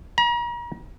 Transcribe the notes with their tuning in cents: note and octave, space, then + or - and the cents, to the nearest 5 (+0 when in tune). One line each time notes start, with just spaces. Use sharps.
A#5 +40